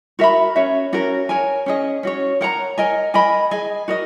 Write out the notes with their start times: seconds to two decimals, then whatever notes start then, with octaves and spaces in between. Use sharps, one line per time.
0.19 F#4 A#4 E5 B5
0.56 C#4 F#4 C#5 E5
0.93 C#4 F#4 A#4
1.29 A#4 C#5 G#5
1.66 C#4 G#4 D#5
2.03 C#4 F#4 C#5
2.41 A#4 C#5 F#5 A#5
2.78 A#4 D#5 G#5
3.14 A#4 D#5 G#5 B5
3.51 G#4 D#5 G#5
3.88 F#4 A#4 D#5